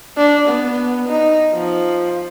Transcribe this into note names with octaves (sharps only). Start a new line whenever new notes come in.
D4
B3
D#4
F3